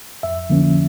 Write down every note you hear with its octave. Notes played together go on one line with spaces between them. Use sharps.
F2 E5
D3 F3 A#3 C#4